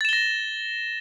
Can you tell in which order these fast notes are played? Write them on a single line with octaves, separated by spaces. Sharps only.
A6 E7 G7 A#6